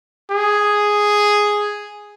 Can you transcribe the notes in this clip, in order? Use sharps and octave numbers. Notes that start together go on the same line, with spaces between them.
G#4